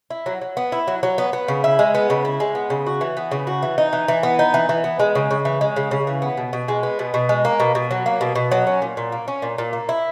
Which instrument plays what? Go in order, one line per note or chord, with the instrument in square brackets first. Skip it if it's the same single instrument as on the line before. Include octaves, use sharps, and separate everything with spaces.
[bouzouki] E4
F#3
F#3
B3
E4
F#3
F#3
B3
B3
C#3
E4
G#3
B3
C#3
E4
G#3
B3
C#3
F#4
E3
B3
C#3
F#4
E3
D#4
E3
E3
B3
D#4
E3
E3
B3
G#3
C#3
C#3
E3
G#3
C#3
C#3
E3
B3
B2
B2
G#3
B3
B2
B2
G#3
A#3
B2
B2
F#3
A#3
B2
B2
F#3
C#4
A#2
A#2
A#3
C#4
A#2
A#2
A#3
E4